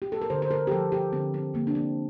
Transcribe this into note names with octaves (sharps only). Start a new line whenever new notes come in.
G4
A4
A#4
D3 C5
C5
A#4
G4
F3 A4
G4
D3 C4
C4
D3 A#3
D4
C4